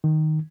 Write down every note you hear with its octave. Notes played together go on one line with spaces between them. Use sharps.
D#3